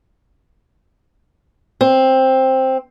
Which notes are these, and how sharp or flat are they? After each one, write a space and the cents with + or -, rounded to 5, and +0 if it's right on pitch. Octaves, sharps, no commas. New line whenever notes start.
C4 +10